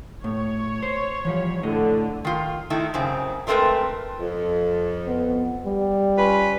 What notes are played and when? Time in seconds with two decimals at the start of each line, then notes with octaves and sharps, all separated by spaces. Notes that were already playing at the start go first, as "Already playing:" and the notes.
0.24 A2 C#5
0.83 C5
1.25 E3 F3 G3
1.63 A2 D3 D#5
2.25 D#3 F4
2.70 D#3 A3 D#4 E4
2.94 F#2 C#3 C4
3.47 F#3 G#3 A3 C4 A#4 B4
4.19 F2
5.07 B3
5.65 G3
6.17 C#4 F4 B4